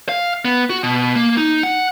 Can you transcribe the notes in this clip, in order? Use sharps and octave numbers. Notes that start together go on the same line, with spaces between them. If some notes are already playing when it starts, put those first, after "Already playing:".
F5
B3
F#4
B2
A#3
D#4
F#5